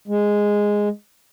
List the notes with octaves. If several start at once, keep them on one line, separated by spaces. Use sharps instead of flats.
G#3